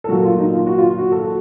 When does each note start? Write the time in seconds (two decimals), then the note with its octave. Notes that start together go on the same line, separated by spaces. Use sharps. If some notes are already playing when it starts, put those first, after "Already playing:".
0.04 A4
0.09 A#2 F#3 A#3 F#4
0.24 F4
0.38 D#4
0.54 F4
0.67 F#4
0.78 F4
0.99 F#4
1.12 A4
1.24 F#4